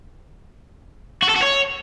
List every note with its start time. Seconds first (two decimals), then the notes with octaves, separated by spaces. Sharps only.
1.23 F#4
1.29 A4
1.36 F#4
1.43 C#5